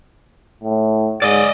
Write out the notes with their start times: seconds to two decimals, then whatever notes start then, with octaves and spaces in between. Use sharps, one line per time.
0.64 A2
1.22 G#2 D5 D#5